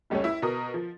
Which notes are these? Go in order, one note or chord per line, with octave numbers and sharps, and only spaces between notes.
F1 C#2 G3 A3 C#4 C#5
E4 E5
B2 A#4 D#6
F3